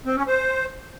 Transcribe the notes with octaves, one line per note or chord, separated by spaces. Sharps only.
C4
C#4
C5